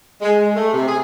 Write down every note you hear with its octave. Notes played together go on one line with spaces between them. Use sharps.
G#3
G#3
A3
C3
G#4